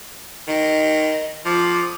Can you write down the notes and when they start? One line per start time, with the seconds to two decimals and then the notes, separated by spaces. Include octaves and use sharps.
0.48 D#3 D#5
1.45 F3 D6
1.81 D#6